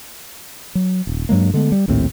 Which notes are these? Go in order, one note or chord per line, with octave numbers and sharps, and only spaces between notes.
F#3
D#1
G2 F#3 G#3 A#3
D3 G#3 A3 B3
G3
A#1 D#2 A2 C4